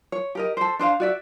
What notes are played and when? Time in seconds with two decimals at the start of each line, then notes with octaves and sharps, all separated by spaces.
0.12 C#5
0.35 G4 A#4 D#5
0.57 A4 C5
0.79 D4 C5 D#5 F5
1.00 F#4 D5 E5